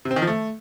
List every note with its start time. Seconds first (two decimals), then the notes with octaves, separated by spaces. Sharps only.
0.05 C3
0.11 C4
0.16 D#3
0.22 F3
0.27 A3